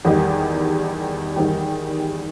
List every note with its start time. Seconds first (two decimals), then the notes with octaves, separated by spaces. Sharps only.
0.05 E2 D#3 G3 D#4
1.36 E2 D#3 G3